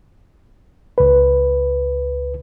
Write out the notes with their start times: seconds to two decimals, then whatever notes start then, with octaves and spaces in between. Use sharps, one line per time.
0.98 C#2 B4